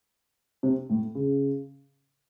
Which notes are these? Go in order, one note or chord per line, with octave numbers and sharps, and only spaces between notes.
C3
A2
C#3